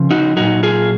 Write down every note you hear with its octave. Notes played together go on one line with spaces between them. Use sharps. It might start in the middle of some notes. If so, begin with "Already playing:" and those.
Already playing: C#3 F3
D#4 F#4
A#2 F#3 D#4 F#4
F4 G#4